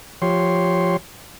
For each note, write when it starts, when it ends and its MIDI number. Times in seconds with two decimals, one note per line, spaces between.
0.22 0.97 53
0.22 0.97 67
0.22 0.97 73
0.22 0.97 84